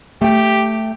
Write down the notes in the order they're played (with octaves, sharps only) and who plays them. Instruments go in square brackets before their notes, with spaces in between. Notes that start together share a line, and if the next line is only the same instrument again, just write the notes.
[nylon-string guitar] A3 G5 [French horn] G4